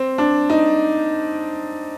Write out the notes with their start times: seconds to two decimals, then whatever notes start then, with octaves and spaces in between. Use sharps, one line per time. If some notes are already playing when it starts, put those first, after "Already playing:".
Already playing: C4
0.18 D4
0.50 D#4